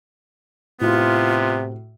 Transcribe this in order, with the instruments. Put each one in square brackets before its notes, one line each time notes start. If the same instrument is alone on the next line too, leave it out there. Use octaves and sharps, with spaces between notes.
[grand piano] A2 F#4 [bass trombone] C3 [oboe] B3 [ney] F4